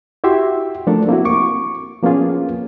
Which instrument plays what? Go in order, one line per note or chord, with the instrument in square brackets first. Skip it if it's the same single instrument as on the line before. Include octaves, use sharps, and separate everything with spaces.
[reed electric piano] E4 F#4 G4 E5 C6
F3 A3 D4 A4 A#4
A#3 C4 E4 F#4
C#6 D6
F3 A#3 B3 C#4 F4 G#4